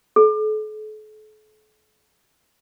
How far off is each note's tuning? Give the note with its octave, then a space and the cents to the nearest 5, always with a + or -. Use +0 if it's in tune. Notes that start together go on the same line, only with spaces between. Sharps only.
A4 -40